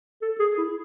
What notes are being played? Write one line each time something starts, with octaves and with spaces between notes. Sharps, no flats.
A4
G#4
E4